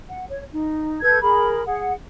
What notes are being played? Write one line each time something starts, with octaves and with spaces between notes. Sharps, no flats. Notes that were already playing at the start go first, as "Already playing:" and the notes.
F#5
C#5
D#4
A4 B4 G6 G#6
G#4 A#4 B5
G#4 F#5